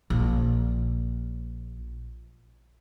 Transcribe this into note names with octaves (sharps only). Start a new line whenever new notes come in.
A#1 C#4